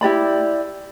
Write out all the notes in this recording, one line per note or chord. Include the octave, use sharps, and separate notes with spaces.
E4 G4 D5 B5